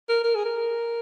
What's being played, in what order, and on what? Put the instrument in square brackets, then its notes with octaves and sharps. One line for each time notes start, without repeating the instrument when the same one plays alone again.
[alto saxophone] A#4
A#4
G#4
A#4